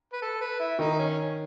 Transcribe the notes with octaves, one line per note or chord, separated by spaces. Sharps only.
B4
A4
B4
E4
D#3 D#4
C#4